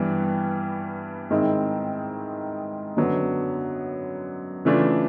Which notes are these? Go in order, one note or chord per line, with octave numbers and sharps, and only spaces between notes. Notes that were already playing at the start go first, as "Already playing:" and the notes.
Already playing: G2 E3 G3 B3
G#2 D#3 G#3 C4 E4
F#2 D3 F#3 B3
C#3 E3 A3 D4 F4